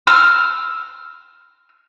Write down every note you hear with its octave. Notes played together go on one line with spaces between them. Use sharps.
E6 F6